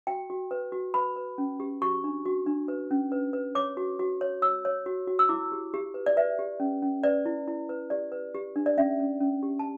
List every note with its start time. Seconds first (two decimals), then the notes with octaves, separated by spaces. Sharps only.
0.07 F#4 G5
0.30 F#4
0.51 B4
0.72 F#4
0.94 B4 B5
1.16 B4
1.38 C#4
1.60 G4
1.82 F#4 C#6
2.04 D4
2.25 F#4
2.46 D4
2.68 B4
2.91 C#4
3.12 B4
3.33 B4
3.55 C#5 D6
3.77 F#4
3.99 F#4
4.21 C#5
4.42 C#5 E6
4.65 C#5
4.86 F#4
5.07 F#4
5.19 E6
5.29 E4 D6
5.52 G4
5.74 G4
5.94 B4
6.06 D5
6.17 B4 E5
6.39 G4
6.60 C#4
6.82 C#4
7.03 B4 D5
7.26 E4
7.48 E4
7.69 B4
7.90 G4 D5
8.12 B4
8.35 G4
8.56 D4
8.66 D5
8.78 C#4 E5
9.00 C#4
9.21 C#4
9.43 G4
9.59 A5